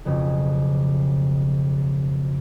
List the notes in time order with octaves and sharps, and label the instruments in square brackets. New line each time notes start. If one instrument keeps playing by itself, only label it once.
[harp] B1 F2 C#3